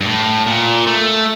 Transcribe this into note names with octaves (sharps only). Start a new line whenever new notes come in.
G2
A2
A#2
A3